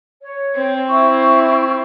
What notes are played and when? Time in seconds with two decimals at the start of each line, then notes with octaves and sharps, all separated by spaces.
0.22 C#5
0.55 C4
0.88 E4 C#6